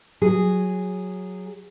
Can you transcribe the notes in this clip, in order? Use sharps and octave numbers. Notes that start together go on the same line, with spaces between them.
F#3 G#4